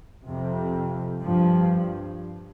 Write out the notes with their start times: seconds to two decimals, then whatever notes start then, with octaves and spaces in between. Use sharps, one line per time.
0.27 F2 C3
1.22 G2 F3